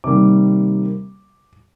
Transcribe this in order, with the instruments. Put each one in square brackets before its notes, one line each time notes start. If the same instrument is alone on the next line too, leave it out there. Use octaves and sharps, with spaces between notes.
[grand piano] C3 D#3 G3 A#3 D6